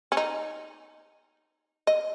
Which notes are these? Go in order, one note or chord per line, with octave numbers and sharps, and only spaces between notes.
C#4
D#4
D#5